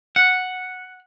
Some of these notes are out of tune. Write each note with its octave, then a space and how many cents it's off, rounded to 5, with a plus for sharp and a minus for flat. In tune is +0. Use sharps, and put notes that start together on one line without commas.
F#5 -5